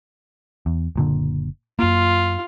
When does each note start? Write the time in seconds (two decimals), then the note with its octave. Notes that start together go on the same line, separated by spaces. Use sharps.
0.66 E2
0.96 F#1 A#2 D3
1.79 F#2 A#3 F4